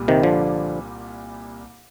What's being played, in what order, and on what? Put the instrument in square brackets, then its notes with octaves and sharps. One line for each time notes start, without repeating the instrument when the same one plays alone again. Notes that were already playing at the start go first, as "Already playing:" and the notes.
Already playing: [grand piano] C2 A#2 G3
[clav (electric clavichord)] C3 D#3
D3 F3